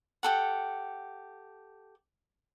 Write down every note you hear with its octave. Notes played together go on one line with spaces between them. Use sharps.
G4 A4 F#5